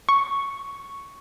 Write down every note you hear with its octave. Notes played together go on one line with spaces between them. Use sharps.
C#6